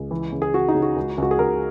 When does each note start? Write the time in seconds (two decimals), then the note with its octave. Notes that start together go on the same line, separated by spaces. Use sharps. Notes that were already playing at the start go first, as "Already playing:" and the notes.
Already playing: C#2
0.11 E3
0.32 C#3
0.42 G#4
0.54 C#3 F#4
0.68 D#4
0.75 C#3
0.82 F#4
0.96 C#2
1.18 C#2 F#4
1.31 G#4
1.39 C#2 A#4